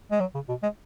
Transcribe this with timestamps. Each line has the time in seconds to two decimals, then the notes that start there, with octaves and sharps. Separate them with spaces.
0.11 G#3
0.20 F#3
0.34 C#3
0.49 B2
0.63 G#3